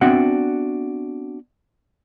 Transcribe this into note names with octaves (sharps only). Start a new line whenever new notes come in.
B3 C4 D4 F#4 E5 F#5